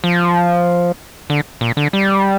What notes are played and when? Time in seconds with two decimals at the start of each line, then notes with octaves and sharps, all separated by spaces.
0.04 F3
1.30 D3
1.61 A#2
1.77 D3
1.93 G3